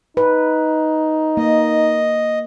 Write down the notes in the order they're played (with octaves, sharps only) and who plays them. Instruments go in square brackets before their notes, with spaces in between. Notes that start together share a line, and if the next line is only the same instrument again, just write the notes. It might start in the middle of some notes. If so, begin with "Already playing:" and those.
[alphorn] D#4 [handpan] B4
[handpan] A#3 [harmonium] D#5